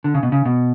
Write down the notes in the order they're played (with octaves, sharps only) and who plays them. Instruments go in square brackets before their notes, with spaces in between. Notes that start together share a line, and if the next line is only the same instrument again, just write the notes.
[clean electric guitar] D3
C#3
B2
C#3
B2